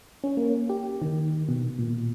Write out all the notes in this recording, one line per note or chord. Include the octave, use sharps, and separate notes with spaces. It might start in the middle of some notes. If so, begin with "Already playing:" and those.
C#4
A#3
G4
D#3
B2
A#2